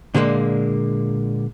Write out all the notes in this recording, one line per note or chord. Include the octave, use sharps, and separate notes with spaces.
A#2 D3 G3 G#3 A#3